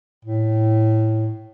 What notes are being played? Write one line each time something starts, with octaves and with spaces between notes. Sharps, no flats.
A2